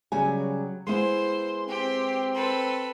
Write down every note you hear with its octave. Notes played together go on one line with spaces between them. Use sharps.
C#3 F#3 G3 G#5
G#3 B3 E4 C5 C6
C4 G4
A4 B4